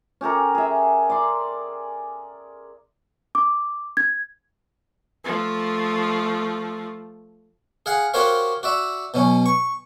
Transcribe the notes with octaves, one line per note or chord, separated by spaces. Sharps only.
C#4 G4 A4 A#4
G#4 E5
D5 C6
D6
G#6
F3 A3
G#4 F5 F#5
F#4 G4 A#4 C5 C#5 F5
F#4 D5 E5
B2 F#3 C#4
C#6